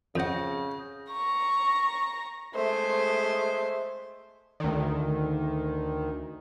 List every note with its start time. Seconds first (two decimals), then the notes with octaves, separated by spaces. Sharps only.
0.16 F2 C#3 F#5 D#6 G6 A#6
1.11 A#5 C#6
2.55 G#3 A3 C5
4.60 D2 D#3